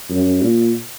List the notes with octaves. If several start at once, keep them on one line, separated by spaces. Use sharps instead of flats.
F#2
A#2